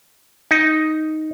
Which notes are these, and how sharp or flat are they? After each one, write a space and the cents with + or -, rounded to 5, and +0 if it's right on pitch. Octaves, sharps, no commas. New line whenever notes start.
D#4 +5